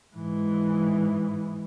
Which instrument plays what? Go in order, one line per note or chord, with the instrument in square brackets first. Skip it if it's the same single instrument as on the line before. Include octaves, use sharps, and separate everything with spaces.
[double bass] G#2 E3